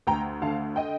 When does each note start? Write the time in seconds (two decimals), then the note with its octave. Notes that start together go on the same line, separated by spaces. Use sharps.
0.07 D2 G5 A#5
0.41 D3 F5 A5
0.76 D#5 G5